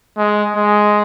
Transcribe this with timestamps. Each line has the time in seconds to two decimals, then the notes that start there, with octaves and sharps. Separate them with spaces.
0.17 G#3
0.56 G#3